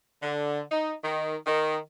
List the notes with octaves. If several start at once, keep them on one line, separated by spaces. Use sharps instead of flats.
D3
D#4
D#3
D#3